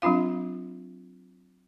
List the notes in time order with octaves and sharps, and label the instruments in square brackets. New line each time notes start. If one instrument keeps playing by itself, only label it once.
[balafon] F#3 C4 D4 F4 F5